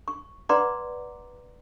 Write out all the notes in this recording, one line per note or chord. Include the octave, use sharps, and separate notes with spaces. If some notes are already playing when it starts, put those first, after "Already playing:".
C#6
B4 D5 F#5 A#5 C6 D6